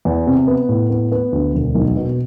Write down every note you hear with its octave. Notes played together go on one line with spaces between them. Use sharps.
E2
C3
B3
A2
B3
B3
D2
E1
B1
B2